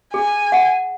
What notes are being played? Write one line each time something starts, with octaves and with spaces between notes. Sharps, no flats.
G#4 G#5
F#5